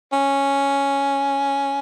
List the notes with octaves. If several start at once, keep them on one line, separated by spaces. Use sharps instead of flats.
C#4